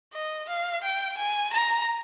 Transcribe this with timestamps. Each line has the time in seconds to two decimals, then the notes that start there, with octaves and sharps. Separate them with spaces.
0.14 D#5
0.49 F5
0.83 G5
1.18 G#5
1.53 A#5